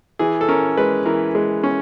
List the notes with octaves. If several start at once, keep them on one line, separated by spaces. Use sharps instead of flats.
E3 G#4
A4
C#4 A#4
G#3 B4
E3 A#4
G#3
C#4